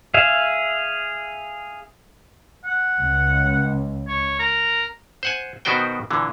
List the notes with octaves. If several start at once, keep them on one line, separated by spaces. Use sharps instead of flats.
G#4 E5 F5
F#5
C#2
C#5
A#4
C5 F#5 G#5
B2 D#3 B3 F#4 C5 G5
A#2 D3 E3